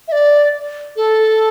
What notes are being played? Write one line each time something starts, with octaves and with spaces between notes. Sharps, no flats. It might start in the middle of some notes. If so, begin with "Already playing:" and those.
E5
D5
A4